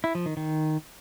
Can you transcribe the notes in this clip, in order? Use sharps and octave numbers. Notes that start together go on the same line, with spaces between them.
E4
F3
D#3
D#3